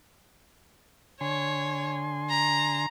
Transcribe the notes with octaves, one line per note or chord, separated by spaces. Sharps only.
D3 C#5 G#5 C6
A#5